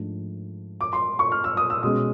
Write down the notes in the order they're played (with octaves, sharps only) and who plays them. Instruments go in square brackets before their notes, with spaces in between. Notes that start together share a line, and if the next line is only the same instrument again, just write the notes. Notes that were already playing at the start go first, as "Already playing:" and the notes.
Already playing: [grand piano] G#2 F3 A3 D4
[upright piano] D6
C6
C#6
F6
E6
D#6
E6
[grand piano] B2 G#3 C#4 [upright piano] D#6